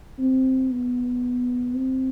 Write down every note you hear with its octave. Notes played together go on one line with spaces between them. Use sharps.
C4
B3
C4